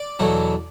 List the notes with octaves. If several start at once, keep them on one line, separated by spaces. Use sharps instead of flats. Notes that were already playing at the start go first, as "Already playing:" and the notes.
Already playing: D5
E2 B2 F#3 A3